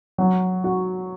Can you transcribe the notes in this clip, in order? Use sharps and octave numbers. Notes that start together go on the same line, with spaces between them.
F#3
F#4